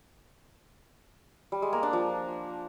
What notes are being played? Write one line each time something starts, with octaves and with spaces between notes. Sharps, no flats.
G3
G#3
A#3
D4
F3